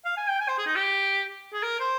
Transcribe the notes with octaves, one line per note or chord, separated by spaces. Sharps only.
F5
G#5
G5
G#5
C5
G#4
D#4
G4
G#4
A#4
C5